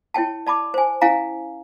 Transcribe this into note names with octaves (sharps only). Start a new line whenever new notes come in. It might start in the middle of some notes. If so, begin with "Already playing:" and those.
E4 C#5 G5 A5
D5 A5 B5 D6
C5 G#5
C#4 E4 F5 G#5 A#5